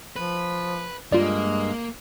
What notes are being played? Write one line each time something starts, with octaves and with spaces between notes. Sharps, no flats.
F3 B4
G2 G#3 A#3 F4 D5